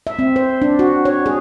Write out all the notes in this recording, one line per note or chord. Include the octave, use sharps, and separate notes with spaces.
E5
C4
C5
D4
F#4
C#5
G#4